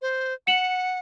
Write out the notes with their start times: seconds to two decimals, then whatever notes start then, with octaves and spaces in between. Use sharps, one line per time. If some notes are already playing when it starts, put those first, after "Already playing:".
0.02 C5
0.47 F#5 C#7 E7 F#7